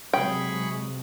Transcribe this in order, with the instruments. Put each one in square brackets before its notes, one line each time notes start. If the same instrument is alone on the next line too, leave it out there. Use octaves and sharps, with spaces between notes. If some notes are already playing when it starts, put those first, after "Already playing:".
[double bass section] C3 F#3 G#3 [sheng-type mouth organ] G#4 B5 C#6 [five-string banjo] G5